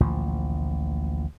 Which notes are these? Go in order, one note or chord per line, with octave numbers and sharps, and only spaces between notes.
A1 D2 A#2 F3